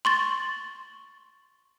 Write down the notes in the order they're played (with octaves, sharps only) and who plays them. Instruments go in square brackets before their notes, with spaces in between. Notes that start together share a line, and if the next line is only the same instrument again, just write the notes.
[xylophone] C6 C#6 A6